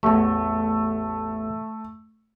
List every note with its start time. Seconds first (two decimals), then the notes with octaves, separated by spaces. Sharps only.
0.03 A1 E2 A3